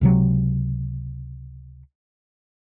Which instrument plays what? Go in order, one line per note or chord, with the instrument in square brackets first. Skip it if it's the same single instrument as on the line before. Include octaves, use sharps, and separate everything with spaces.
[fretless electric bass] C#2 C3 F#3